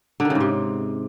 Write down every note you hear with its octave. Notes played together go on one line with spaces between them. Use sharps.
D3
D#3
C#3
G#2
C3